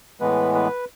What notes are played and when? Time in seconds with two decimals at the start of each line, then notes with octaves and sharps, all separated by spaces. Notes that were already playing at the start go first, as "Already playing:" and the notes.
0.20 A2 E3 G#3 B3 B4
0.54 B4